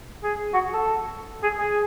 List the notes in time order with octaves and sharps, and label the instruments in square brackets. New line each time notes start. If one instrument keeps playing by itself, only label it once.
[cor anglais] G#4
F#4
A4
G#4
G#4